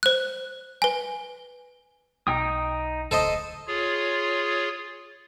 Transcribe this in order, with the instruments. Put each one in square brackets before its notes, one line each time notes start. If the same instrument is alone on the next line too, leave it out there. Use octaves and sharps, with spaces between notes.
[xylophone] C5 F#6
B4 G#5
[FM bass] B1 [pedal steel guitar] D#4 G5 D#6
[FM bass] D1 [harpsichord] A4 C5 D#5
[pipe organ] F4 G#4 C#5